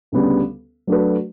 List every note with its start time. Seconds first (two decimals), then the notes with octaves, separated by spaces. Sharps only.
0.12 D2 C#3 G3 B3
0.87 F#3 A3 D4 F#4 B4